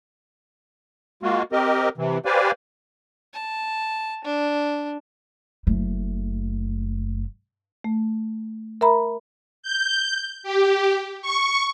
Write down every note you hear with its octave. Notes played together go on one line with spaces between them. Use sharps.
G#3 A#3 F4 F#4
C4 G4 A#4 D#5
C3 E3
G4 B4 C5 D5 F5 G#5
A5
D4
F#1 A3
A3
A#4 E5 A#5 B5
G6
G4
C#6